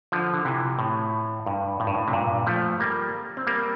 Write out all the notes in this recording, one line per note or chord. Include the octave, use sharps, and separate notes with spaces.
D3 F3
D3
C3 E3
A2
G2
A2
G2
A2
C3
G2 A#2
F3 A3
G3 A#3
C4
G3 A#3